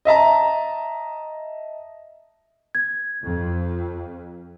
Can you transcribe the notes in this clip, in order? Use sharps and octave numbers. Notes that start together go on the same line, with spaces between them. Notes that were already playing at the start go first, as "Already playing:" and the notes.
D#5 E5 A5 A#5
G#6
F2